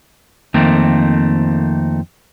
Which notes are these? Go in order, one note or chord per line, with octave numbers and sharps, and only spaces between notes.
F2 D#3 A3 A#3 C4